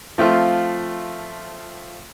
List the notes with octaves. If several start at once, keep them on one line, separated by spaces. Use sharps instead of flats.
F3 A3 C4 F4